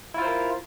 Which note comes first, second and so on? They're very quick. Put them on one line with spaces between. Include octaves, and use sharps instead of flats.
E4 F4 C5 A#4